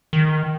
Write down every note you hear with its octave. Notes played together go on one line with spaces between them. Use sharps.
D#3